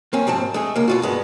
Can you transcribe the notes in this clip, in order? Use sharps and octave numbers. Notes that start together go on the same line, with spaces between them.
A#3 C4 C#4
G#2 F3 C4 A5
G#3 A3 G#4
C#2 A#3
B2 F4 F#4
G2 G#3 B3